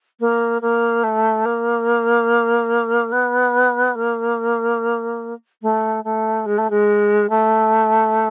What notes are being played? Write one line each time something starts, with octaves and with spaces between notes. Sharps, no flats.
A#3
A#3
A3
A#3
B3
A#3
A3
A3
G#3
A3
G#3
A3